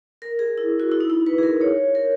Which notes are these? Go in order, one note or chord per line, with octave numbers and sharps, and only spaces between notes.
A#4
G#4
E4
F#4
E4
D#4
E4
B4
G#4
A#4
C#5
A#4